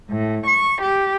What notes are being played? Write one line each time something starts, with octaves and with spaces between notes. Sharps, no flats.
A2
C#6
G4